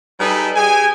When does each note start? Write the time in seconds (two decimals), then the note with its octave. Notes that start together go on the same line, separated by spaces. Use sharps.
0.20 G3 D#4 G#4 A4 B4
0.56 G4 G#4 G#5